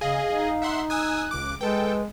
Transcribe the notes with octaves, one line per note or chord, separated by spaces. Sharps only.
C#3 G#4 D#5 F5
D#4
E5 F#5 C6
G#5 D#6 E6 F#6
C#2 D6
G#3 A4 B4 G5